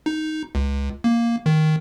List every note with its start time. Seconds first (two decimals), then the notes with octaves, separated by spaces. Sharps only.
0.06 D#4
0.55 C#2
1.04 A#3
1.46 D#3